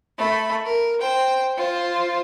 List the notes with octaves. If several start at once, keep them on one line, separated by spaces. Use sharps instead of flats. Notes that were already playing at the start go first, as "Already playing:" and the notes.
A3 B5
A#4
C5 G5
F4 C5